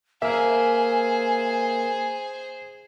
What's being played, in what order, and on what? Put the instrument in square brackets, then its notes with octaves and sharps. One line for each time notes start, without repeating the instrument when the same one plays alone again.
[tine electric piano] A#3 A#4 [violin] G#4 C5 [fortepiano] E5 [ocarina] G#5